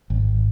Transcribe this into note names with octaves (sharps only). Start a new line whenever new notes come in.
G#1